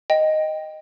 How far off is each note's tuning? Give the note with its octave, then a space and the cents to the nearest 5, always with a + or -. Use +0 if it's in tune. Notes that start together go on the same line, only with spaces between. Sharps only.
D#5 +0 G5 +0